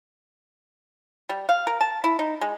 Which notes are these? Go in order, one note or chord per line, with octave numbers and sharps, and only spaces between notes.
G3
F5
A#4
A5
E4
D#4
G#3